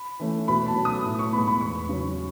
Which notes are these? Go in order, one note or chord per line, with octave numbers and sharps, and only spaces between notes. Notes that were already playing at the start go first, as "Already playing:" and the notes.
Already playing: B5
E3 A3 C#4
B2 B5
A5
F#3 A3 C#4
D#6
A2
C#6
G#3 B3 B5
B5
E2 C#6
C#3 F#3 C#4